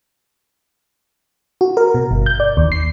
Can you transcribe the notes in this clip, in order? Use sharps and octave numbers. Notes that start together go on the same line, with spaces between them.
F#4
A#4
B2
G1
G6
D5
D#2
C7